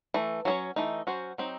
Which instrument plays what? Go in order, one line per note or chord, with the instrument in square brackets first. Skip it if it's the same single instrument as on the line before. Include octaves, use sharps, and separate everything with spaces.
[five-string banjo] E3 A3
F#3 C#4 G#4 C#5
E3 A3 D#4
F#3 C#4 F#4 C5
F#3 C4 D#4